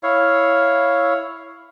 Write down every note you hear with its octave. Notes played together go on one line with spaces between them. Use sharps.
E4 C#5 F5